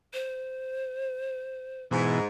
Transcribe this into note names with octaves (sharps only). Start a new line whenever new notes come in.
C5
G#2 B2 E3